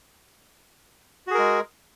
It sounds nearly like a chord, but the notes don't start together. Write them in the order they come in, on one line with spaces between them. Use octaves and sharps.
F#4 G#4 A#4 G#3